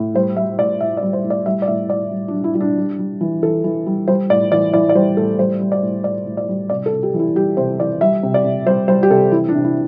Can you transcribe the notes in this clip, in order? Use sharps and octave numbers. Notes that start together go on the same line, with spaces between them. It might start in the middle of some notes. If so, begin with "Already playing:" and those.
Already playing: A2
G3 C5
G3 E5
A2 D5
A2 E5
D5
G3
C5
A2
D5
G3 E5
D5
A2 E5
A2 D5
G3
D4
G3
E4
G3 E4
D4
G3
G3
E3
E3 A4
E3
G3
G3 C5
A2 D5
E3 D5
E3 D5
D5
G3 C5
A2 A4
G3 C5
G3
D5
A2
A2 D5
A2
D5
G3
C3 D5
A4
C3
G4
E3
E4
G3 G4
C3 C5
E3 D5
G3 E5
C3
D5
C3
G3 C5
G3 C5
G4
C3 A4
E3 E4
D4
C3
E4